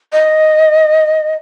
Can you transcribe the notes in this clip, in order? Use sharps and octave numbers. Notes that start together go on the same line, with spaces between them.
D#5